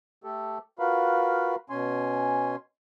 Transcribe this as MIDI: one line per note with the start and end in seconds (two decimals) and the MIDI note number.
0.24 0.58 57
0.24 0.58 67
0.24 0.58 69
0.79 1.56 65
0.79 1.56 66
0.79 1.56 70
0.79 1.56 71
0.79 1.56 77
0.79 1.56 83
1.70 2.56 47
1.70 2.56 61
1.70 2.56 80
1.70 2.56 84